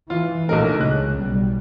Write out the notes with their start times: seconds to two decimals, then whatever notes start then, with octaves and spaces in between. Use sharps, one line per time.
0.10 E3 F4
0.49 A#1 A3 D#4 A#4
0.81 C#2 C#3 F#6
1.19 B1 G3